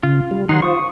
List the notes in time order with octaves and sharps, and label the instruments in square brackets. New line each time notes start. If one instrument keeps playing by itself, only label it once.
[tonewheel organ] C#3 [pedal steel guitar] F4
[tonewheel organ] G3
[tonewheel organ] D#3 F#5 C6 [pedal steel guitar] F#3 D#4
[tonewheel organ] F4 C5 [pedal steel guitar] C#6 D#6